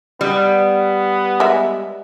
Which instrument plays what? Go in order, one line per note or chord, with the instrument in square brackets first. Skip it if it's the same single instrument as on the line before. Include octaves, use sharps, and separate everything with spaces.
[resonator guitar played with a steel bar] G3 [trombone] B3
[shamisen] G#3 E5